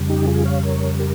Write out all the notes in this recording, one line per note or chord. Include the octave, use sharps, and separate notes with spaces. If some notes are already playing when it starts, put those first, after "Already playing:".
Already playing: F2 C#3 G3
D#4 G4
F4 G#4
C#5 F5
A#4 C#5
G4 A#4